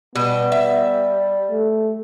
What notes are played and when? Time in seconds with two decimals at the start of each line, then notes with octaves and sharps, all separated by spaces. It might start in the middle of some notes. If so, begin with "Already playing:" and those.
0.15 B2 G3 B3
0.52 E5
1.50 A3